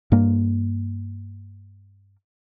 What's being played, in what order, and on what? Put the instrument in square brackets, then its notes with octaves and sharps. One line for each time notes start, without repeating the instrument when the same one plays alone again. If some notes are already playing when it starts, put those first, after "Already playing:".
[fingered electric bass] G2 A#3